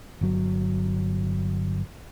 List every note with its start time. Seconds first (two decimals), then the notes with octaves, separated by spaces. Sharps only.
0.21 G1 F#3